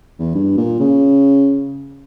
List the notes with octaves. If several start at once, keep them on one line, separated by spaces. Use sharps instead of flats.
E2
G2
A#2
C#3